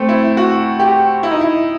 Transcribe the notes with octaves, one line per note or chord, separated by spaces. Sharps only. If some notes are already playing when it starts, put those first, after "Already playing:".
Already playing: A3 C4
E4
F#4
G4
E4
D#4
E4